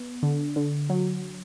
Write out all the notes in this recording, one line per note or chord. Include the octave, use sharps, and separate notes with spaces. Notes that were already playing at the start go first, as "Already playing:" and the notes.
Already playing: B3
D3
D3
F#3